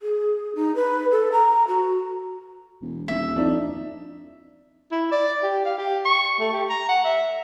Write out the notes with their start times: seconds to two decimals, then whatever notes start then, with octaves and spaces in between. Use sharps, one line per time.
0.02 G#4
0.55 D#4
0.76 B4
1.11 A4
1.32 A#5
1.68 F#4
2.82 E1
3.08 D#1 E5
3.36 F2 D4 D#4
4.91 E4
5.11 D5
5.43 G4
5.65 F5
5.78 G4
6.05 C#6
6.40 A3
6.52 G4
6.70 A#5
6.89 F#5
7.04 E5